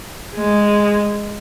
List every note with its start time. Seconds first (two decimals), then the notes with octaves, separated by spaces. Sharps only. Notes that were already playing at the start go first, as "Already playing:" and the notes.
0.36 G#3